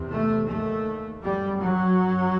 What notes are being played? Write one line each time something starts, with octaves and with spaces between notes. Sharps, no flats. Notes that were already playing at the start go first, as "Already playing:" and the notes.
Already playing: E2 C3
A3
D#2 A3
F#2 G3
F#3
F#2